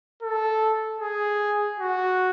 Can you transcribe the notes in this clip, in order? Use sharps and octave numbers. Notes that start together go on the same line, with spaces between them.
A4
G#4
F#4